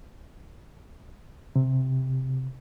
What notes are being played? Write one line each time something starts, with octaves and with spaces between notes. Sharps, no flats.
C3